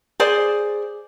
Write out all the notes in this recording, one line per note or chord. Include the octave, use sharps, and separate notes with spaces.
G#4 C5 D5